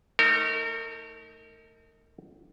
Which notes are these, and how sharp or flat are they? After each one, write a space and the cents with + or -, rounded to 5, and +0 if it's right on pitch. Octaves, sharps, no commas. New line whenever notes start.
A3 +0 D#4 +25 A#4 -35